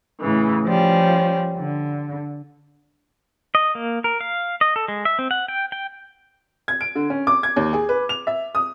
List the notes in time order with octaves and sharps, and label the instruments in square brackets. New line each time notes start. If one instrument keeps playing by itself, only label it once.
[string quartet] A2 C#3 E3
F3 G3 C#4
D3
[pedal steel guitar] D#5
A#3
A#4
F5
D#5
A4
G#3
E5
C4
F#5
G5
G5
[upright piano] G#6
D7
D3
C#4
D6
G#6
D#2
G#4
B4
F7
E5
D#6